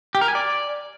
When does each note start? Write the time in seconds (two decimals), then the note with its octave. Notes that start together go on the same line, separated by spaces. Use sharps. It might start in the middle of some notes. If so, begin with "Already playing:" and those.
0.15 G4
0.21 A#4
0.28 G#5
0.35 D5